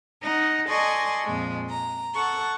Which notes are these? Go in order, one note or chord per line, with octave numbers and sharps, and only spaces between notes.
D#4 F#5
A4 D5 D#5 G#5 C6 C#6
F2 A#2 G#3
A#5
A4 F#5 A5 C#6